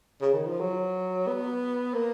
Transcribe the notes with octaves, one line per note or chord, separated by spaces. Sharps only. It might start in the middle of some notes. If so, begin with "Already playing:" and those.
C#3
D#3
F3
F#3
B3
A#3